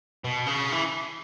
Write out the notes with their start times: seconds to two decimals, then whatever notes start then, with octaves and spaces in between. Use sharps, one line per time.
0.24 B2
0.46 C#3
0.72 E3